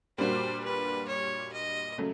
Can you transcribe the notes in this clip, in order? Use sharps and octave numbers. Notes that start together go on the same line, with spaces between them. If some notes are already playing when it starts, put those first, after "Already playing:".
A#2 G3 A#3 D4 F#4 C5
B4
C#5
D#5
C#3 F#3 A3